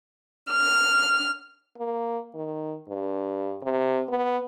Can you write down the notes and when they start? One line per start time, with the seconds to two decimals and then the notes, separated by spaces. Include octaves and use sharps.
0.49 F6
1.78 A#3
2.35 D#3
2.88 G2
3.62 C3
4.09 B3